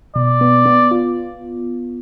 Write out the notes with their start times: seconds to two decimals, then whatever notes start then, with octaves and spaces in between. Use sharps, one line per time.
0.15 B2 D5
0.41 B3
0.66 B3
0.91 F4